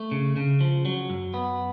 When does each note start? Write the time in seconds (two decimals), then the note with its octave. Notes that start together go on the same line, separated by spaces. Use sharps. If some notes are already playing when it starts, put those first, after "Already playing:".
Already playing: A3
0.11 C#3
0.36 C#3
0.61 F3
0.85 F#3
1.10 F#2
1.34 B3